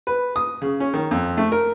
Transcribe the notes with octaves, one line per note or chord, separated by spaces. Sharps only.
B4
D#6
C#3
C#4
D#3
F2
A3
A#4